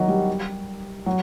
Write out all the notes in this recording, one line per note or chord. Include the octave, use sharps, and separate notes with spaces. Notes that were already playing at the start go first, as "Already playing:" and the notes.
Already playing: D#3 F#3
G3
F#3